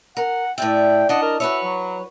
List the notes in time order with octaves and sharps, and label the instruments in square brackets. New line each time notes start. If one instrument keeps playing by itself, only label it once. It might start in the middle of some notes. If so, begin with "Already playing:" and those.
[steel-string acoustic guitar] A#4 [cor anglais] F#5
[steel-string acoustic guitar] A2 D5 E5 [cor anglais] G5
[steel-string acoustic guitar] D4 D#5 [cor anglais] F#5
[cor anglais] A#4
[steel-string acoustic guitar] F#4 B4 C#5 [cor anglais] E5
[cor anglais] F#3